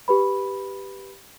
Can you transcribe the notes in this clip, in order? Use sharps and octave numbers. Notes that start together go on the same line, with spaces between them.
G4 B4 B5